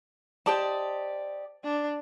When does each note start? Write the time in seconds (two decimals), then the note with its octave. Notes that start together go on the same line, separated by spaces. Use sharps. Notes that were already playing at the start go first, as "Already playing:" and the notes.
0.46 G4 C5 D5 D#5 A5
1.64 D4